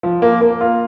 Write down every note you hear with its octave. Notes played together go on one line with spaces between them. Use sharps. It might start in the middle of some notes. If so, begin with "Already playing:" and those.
F3
A#3
A#3
F4